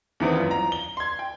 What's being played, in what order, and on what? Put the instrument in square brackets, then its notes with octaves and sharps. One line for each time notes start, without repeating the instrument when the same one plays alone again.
[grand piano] E2 D#3 E3 B3 C4
F#2 F4
A#5
G7
C6 G#6
G5